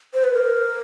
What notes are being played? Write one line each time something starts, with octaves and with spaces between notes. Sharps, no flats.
C5
B4
A#4